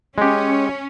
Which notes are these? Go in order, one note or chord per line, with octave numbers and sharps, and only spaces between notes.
G#3 C#4 G4